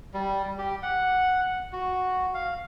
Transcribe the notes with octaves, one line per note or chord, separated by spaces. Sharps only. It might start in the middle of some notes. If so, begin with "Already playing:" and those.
G3
G4
F#5
F#4
F5